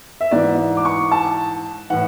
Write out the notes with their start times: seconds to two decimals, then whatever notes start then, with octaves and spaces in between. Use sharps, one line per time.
0.21 E5
0.31 G#2 E3 D5
0.77 D6
0.85 C#6
1.11 A5
1.90 A2 E3 F#5